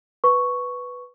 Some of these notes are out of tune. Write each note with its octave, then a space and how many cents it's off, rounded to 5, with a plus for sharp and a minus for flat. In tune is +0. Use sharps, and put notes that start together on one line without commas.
B4 +0 C#6 +0